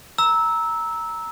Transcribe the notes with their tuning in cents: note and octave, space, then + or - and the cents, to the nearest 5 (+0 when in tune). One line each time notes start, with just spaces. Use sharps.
A#5 +0 E6 -15